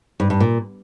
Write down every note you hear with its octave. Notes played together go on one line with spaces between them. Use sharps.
G2
G2
A#2